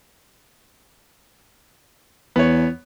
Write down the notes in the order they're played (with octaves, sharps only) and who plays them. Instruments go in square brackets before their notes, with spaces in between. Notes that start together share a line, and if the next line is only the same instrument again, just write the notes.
[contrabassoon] E2 [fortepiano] B3 C#5